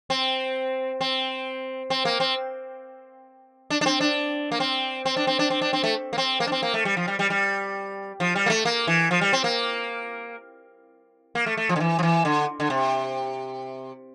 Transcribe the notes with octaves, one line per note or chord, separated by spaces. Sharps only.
C4
C4
C4
A#3
C4
D4
D4
C4
D4
A#3
C4
C4
D4
C4
D4
C4
D4
C4
A3
A#3
C4
A#3
D4
C4
A#3
A3
G3
F3
G3
G3
G3
F3
G3
A#3
A3
A#3
E3
F3
G3
C4
A#3
A#3
A3
A3
F3
D3
E3
F3
E3
D3
D3
C3